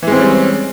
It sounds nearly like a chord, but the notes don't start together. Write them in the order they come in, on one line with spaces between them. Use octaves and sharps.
E3 G#3 C4 C#4 G3